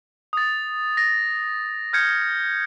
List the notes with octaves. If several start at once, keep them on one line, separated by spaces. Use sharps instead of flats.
D#6 A6
A#6
F6 G6 G#6 C#7